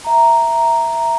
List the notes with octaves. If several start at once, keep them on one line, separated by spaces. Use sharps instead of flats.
E5 A#5